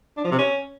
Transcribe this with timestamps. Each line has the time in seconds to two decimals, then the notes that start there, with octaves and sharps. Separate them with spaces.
0.17 D4
0.24 F3
0.31 C3
0.38 C#4